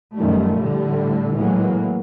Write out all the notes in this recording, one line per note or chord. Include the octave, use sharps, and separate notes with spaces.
F#2 D#3 F3 G3 A3
A2 D3 G3
A2 E3 F#3 G#3 A#3